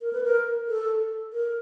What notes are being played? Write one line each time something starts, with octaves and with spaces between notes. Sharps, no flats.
A#4
B4
A#4
A4
A#4